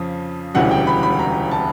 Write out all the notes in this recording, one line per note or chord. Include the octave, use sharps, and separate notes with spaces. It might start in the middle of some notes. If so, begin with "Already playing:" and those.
Already playing: F2 C#3 F3
E1 D2 C#3 E3 G3 F#5
G5
B5
B5
A#5
A5